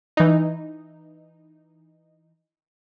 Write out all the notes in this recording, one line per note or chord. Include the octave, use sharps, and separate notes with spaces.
E3 D#4